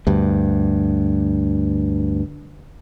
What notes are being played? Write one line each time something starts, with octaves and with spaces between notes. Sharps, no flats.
D2 G2